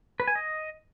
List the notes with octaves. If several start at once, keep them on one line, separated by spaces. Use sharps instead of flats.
B4
G#5
D#5